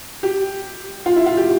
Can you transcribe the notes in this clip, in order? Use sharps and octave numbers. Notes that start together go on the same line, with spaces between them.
G4
F4
E4
F4
G4